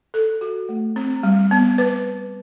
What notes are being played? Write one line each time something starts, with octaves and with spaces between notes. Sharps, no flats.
A4
F#4
A3
C4
G3
B3
B4